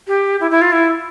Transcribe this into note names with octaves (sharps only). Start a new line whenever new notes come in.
G4
E4
E4
F4
E4